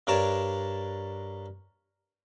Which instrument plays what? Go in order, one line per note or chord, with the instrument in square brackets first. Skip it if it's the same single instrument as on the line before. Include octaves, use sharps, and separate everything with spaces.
[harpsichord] G2 D4 A#4 C#5 D5 A5